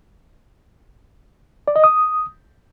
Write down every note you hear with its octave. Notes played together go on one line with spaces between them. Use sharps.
D5
D#5
D#6